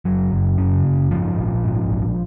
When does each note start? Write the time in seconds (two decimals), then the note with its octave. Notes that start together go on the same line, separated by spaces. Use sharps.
0.05 F#1 F#3
0.33 F#1
0.58 C#3
0.85 F#1
1.11 G#2 F3
1.38 A#1
1.64 G#2
1.90 A#1